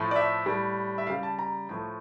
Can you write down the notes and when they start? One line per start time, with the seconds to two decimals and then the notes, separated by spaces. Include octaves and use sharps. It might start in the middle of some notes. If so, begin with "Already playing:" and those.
Already playing: A2 F3 A3
0.11 D5
0.16 E5
0.46 A2 G3
0.98 E5
1.07 C#3 G3 F5
1.23 A5
1.39 A#5
1.69 A2 F3 A3